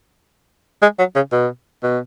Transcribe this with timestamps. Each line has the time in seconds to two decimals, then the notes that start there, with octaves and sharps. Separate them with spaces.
0.82 G#3
0.99 F#3
1.15 C#3
1.32 B2
1.83 B2